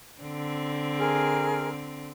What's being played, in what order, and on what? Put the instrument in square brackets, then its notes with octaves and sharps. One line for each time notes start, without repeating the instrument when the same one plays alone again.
[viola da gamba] D3 C4
[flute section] G#4 A#4 F6